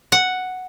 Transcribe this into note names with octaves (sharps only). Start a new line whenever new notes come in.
F#5